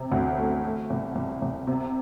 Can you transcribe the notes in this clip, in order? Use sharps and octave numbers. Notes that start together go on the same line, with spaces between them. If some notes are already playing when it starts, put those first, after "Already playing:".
Already playing: C3
D2
A3
A3
C2
C2
C2
C3